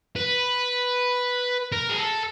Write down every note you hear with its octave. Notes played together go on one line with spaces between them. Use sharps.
B4
A#4
G#4
A4